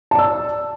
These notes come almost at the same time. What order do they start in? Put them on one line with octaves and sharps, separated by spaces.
A5 D5 E6